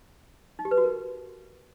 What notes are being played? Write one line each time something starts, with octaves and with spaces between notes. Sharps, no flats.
D#4
G4
B4
F#4
A#4